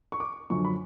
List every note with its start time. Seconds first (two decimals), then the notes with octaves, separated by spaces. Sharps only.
0.12 C#6
0.20 D6
0.50 F#2 D3 F3 C#6
0.65 B5